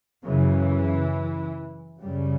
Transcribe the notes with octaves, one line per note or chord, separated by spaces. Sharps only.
F#2 C#3 E3
F#2 C#3 G3